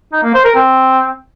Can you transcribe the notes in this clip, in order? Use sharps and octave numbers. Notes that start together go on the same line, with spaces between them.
D#4
A#3
C5
A#4
C4